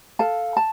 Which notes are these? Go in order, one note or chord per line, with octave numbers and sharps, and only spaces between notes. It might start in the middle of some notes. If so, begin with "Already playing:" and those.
A4 F5 A5
A5